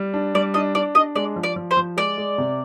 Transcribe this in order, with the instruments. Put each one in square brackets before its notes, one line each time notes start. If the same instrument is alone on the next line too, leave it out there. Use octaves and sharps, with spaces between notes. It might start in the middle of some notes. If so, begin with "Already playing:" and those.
Already playing: [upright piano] G3
D4
[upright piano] G3 [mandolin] D5
[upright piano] D4 [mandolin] D#5
[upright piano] D4 [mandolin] D5
[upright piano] D4 [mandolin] D#5
[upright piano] G#3 [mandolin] D5
[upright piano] F3
[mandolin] D5
[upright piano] F3
[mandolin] C5
[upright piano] F3
[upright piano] G#3 [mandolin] D5
[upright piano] G#3
C3